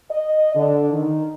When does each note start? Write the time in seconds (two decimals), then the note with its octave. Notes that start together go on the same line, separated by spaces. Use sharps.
0.11 D#5
0.55 D3
0.93 D#3